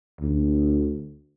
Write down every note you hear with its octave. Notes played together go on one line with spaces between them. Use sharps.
D2